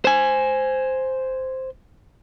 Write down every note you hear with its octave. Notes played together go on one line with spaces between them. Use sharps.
C5 G#5